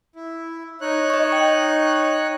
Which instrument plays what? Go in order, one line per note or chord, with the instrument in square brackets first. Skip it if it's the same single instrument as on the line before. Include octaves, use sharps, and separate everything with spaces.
[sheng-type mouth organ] E4
D#4 C#5 F#6
[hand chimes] D#5 C#6
G5